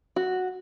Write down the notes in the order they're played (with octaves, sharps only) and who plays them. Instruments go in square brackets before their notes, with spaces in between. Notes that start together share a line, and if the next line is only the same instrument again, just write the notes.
[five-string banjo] F#4